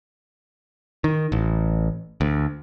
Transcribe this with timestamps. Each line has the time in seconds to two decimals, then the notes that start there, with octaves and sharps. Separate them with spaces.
1.04 D#3
1.32 A1
2.21 D2